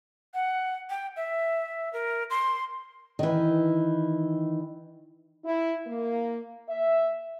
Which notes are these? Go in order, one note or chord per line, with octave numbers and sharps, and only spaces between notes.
F#5
G5
E5
A#4
C6
D#3 E3
E4
A#3
E5